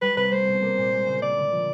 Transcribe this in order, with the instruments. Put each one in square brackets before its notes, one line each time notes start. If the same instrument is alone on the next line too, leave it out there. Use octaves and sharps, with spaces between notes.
[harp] G3 [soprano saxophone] B4
[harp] C3 [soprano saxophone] B4
[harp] A3 [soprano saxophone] C5
[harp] B2
A#3
A#2
G#3
C#3
[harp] A#3 [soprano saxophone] D5
[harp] D3
F3